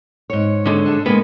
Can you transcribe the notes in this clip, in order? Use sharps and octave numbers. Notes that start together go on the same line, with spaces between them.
G#2 C#5
D3 G#3
D4 G#4 A4
G#3 A#3 B3